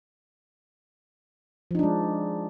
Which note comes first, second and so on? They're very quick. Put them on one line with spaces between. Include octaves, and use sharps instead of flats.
F3 D#4 D4 G#3